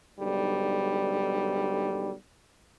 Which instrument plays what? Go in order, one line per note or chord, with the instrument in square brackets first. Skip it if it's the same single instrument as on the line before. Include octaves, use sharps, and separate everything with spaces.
[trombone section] B1 G#2 D3 G3